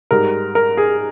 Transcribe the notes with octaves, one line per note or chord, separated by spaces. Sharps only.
G#2 G3 A#4
A#4
G#4